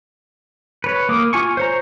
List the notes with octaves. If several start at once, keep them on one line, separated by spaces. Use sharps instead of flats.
B4 C#5
A#3 D6 D#6
F4 G#5 C#6
C5 C#5 A#5